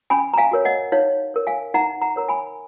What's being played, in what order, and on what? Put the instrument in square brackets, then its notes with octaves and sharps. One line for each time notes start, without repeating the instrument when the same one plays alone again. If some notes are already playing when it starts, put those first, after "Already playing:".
[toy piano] C#4 G#5 B5
A#5
F5 G#5
F#4 A#4 C#5
D#5 F#5
D#4 C#5 F5
A#4 C#5
F5 G#5
D#4 F#5 A#5
F#5 A#5
A#4 C#5 A#5
G#5 B5